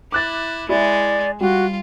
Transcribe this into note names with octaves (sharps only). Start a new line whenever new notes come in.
E4 D6 F#6 A6
G#3 E4 D5
G3 F4 F#4